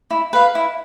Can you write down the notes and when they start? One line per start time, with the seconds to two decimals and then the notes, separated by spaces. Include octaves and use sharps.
0.11 E4
0.33 B4 F5
0.55 E4